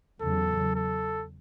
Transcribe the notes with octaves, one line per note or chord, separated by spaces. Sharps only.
E2 C#3 F#3 A4
A4